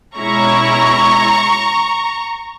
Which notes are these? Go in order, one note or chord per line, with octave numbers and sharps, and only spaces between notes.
B2 G#3 C#4 E4 A#5 C#6